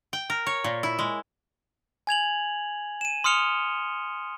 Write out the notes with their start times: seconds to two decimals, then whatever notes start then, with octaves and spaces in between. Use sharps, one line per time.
0.13 G5
0.30 A#4
0.46 C#5
0.64 A#2
0.83 E4
0.99 G#3
2.07 G#5 G#6 F7 F#7
3.01 D#7 E7
3.24 C6 D#6 F6 C#7 F7 G7